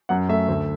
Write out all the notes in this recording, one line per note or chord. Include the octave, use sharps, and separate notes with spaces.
F#2 F#5
A3 E5
D2